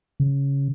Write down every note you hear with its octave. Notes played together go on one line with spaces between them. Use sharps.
C#3